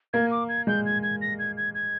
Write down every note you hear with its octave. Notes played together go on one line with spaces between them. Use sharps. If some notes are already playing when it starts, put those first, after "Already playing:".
A#3 G#6
D6
G#6
G#3 G6
G#6
G#6
A#6
G#6
G#6
G#6